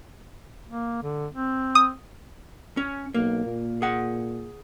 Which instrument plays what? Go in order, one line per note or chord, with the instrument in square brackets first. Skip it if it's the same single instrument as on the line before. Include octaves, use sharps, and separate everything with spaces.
[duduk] A#3
D3
C4
[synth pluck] D#6
[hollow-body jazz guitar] C#4
[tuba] B1 [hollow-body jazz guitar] A#3
[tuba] A#2
[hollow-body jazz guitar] G#4 F#5